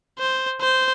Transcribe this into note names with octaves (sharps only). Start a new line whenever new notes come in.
C5
C5